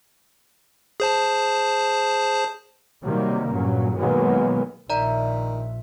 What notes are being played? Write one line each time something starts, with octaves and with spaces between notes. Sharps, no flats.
G#4 C5 A5
C3 D#3 F#3 G3 A#3
G2 A#2 C#3 F#3
B2 D#3 F#3 G#3 A#3 B3
A#1 D#3 D5 E5 A#5